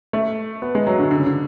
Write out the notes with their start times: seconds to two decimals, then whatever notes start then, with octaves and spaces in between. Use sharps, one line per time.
0.13 A3
0.62 B3
0.75 G#3
0.87 F#3
0.99 D3
1.11 D3
1.19 C#3
1.26 D3